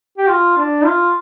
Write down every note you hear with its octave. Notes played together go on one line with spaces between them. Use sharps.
G4
F4
D4
F4